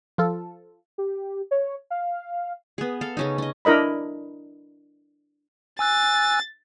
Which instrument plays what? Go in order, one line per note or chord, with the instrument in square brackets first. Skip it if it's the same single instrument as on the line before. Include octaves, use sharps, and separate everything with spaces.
[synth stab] F3 F4 A4
[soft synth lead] G4
C#5
F5
[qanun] B3 G#4
A4 F5
C#3 C#4 D#4
C#4 D#5
[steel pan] D4 E4 A#4 D#5 B5
[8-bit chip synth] G#5 E6 F#6 [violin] A6